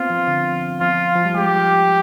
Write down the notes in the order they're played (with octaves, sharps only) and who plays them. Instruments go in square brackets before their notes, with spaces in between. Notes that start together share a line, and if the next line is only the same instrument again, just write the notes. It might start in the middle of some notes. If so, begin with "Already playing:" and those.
Already playing: [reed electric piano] B3 C4 [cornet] F4
[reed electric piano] F3
D3
[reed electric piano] F3 [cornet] F4
[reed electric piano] F3
G3
[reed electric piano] G#3 [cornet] G4